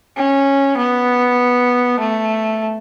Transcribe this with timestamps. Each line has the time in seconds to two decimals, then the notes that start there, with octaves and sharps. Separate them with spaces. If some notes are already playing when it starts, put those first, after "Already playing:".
0.17 C#4
0.78 B3
2.00 A3